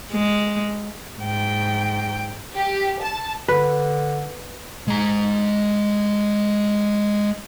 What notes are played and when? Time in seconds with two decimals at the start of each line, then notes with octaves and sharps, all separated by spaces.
0.11 G#3
1.18 G#2 G5
2.54 G4
3.02 A5
3.48 D3 B4
4.88 G#3 A#5